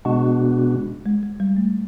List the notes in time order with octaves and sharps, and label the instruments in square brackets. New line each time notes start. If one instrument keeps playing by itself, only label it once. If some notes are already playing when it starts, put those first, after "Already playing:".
[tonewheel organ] B2 G#3 B3 D4 F#4
[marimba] G#3
G#3
G3
A3